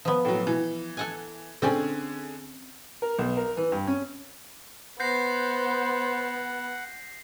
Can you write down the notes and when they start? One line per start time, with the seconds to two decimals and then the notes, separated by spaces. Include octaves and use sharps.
0.05 F3 B3
0.25 A2 F#3
0.47 E3
0.97 A4 F#5 G#5
1.62 D3 C4 C#4 G#4 D5
3.02 A#4
3.19 B1
3.37 A#4
3.57 E3
3.72 G2
3.87 C#4
5.00 B3 C5 F#5 G6 A#6 C7